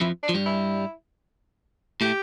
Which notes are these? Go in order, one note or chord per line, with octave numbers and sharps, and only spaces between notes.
F2 F3 E4
D4
F3
G2 G3
E4
A2 A3 G4